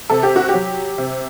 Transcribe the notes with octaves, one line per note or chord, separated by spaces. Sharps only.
C3 A4
G4
F#4
G4
F#3
C3